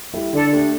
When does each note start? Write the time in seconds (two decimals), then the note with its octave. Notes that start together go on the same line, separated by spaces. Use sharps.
0.13 G3 E4 A4
0.33 D3 A4 D5
0.52 A3 D4 G4